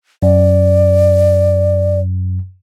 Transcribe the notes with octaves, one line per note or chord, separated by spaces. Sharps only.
F#2 D5